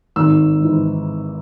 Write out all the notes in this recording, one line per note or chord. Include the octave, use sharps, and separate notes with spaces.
G#1 E6
G#2 E3